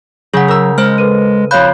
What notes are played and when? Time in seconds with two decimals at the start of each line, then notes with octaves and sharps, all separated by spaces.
0.34 C#3 F#3 G#4 F#5 G6
0.48 A#4 E6
0.78 G#3 C5 F6
0.98 A4 B4 D#7
1.51 F2 C#5 F5 B5 F#6 G6